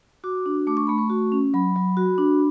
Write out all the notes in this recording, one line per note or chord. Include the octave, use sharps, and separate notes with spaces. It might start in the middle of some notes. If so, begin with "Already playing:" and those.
F#4 D6
D4
A3 D6
C#6
A3 B5
C#6
F#4
C#4
F#3 B5
F#3
F#4
D4